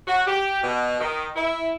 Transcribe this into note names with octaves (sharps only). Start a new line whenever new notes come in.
F#4
G4
B2
D#3
E4